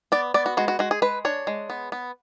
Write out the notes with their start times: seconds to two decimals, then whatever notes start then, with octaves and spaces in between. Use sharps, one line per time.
0.12 B3 D5
0.34 B3 D5
0.46 F#4
0.57 G#3 F#4
0.68 F#4
0.79 G#3 F#4
0.91 G#4
1.02 G#3 B4
1.25 D4 C#5
1.47 G#3
1.70 B3
1.92 B3